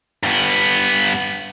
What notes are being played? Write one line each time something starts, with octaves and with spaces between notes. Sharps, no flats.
G2 B3